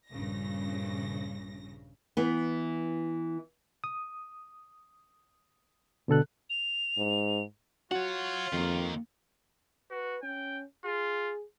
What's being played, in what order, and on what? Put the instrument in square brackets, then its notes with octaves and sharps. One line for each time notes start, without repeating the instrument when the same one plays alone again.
[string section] A#1 G2 C#3 A#6
[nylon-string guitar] E3 B3
[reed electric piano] D#6
B2 D3 A4 F#6
[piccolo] F7
[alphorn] G#2
[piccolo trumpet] F4 [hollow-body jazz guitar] F#4 [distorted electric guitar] C#5 F#5
[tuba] F2 [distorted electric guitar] D#3 A#3
[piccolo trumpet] F#4 [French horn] B4
[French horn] C#4 [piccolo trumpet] G5
[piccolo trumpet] F4 [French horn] G#4